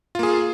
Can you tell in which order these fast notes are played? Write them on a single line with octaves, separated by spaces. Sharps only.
F4 A#3 G#4